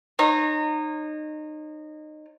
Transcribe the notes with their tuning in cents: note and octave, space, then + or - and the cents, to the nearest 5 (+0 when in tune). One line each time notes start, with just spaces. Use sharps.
D#4 -25 C#5 -35